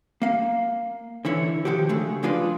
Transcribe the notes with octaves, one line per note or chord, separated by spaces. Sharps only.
A#3 F5
D3 E3 E4 C#5
D#3 F3 F#4 G4
C#3 G#3 A3 D4
F3 G#3 D4 F4 B4 D5